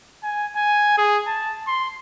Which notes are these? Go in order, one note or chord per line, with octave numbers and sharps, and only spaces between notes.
G#5
G#5
G#4
A5
C6